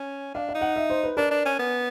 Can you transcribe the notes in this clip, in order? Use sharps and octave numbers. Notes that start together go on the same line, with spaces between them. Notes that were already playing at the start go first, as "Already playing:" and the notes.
Already playing: C#4
D4 F5
F5
D#4
F#5
E5
C5
B4
D4 A#4
D4
C#4
B3